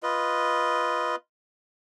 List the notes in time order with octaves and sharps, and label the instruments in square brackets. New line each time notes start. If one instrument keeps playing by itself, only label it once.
[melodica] F4 B4 D#5